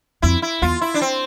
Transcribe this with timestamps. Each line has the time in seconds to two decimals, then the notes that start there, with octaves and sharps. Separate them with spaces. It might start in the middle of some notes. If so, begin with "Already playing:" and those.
0.22 F2 E4
0.42 E4
0.62 E2 F4
0.81 E4
0.94 D4
1.01 C4